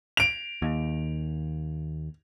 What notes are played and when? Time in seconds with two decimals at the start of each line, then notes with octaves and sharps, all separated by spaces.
0.17 D7 F7
0.62 D#2